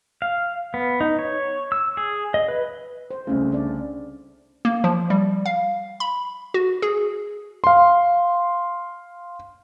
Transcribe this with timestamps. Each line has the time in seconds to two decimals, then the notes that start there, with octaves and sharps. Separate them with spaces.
0.22 F5
0.74 B3
1.01 D#4
1.19 C#5
1.72 E6
1.97 G#4
2.34 D#5
2.48 B4
3.11 C5
3.27 C2 C#3 A3 C#4
3.52 D4 D5
4.65 A#3
4.84 F3
5.10 G3
5.46 F5
6.00 B5
6.54 F#4
6.82 G#4
7.64 F5 C6